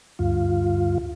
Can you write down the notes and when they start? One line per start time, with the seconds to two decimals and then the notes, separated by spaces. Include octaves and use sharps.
0.19 D2 G2 F4